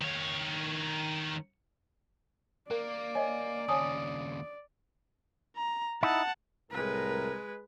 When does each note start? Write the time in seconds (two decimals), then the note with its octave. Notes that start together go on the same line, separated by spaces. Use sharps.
0.01 D#3 C#5
2.71 A#3 A#4 D5
3.15 C#5 D#5 G#5
3.69 D#2 C#3 C#5 G#5 A5 D#6
5.57 A#5
6.03 D#4 E4 F#5 A5
6.71 C2 A2 G#3 A#4 B4